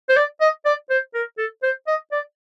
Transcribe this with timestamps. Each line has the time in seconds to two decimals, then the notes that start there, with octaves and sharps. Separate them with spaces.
0.09 C5
0.17 D5
0.41 D#5
0.65 D5
0.90 C5
1.14 A#4
1.38 A4
1.63 C5
1.87 D#5
2.12 D5